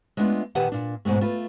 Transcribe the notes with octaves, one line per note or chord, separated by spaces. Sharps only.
G#3 A3 B3 D4 F4
A#2 D#3 G4 B4 F#5 A5
A#2 D4
G#2 B2 G#3 A3
A3 F4 B4